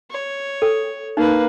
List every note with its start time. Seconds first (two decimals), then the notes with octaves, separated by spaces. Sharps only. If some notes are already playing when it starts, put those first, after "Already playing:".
0.10 C#5
0.62 A4
1.17 A#3 D#4 B4